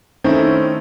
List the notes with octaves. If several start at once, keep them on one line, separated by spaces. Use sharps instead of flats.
D#3 A3 C4 C#4 D#4 E4